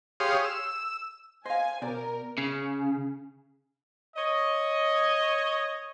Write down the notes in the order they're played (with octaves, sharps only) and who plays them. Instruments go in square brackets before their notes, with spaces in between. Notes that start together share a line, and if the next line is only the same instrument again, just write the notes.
[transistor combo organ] G4 G#4 C#5 F5 C6 D#6
E6
[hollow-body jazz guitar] C5 [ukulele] D#5 F5 [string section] G#5
[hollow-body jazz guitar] B2 [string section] A#4 [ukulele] C5 D5
[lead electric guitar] C#3
[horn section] C#5 D#5